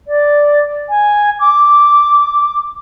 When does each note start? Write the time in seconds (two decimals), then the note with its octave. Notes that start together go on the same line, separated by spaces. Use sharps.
0.07 D5
0.89 G#5
1.39 D6